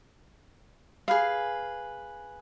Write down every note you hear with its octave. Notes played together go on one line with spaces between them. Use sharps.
G#4 B4 F5